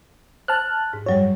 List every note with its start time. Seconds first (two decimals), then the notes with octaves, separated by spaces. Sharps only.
0.48 C5 A5 F6 F#6
0.93 G#2
1.06 F#2 F#3 G3 C#5